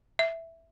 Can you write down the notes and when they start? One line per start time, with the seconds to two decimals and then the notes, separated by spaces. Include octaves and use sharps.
0.19 E5